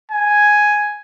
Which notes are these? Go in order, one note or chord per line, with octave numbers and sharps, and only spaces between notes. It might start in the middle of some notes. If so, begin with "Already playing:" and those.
G#5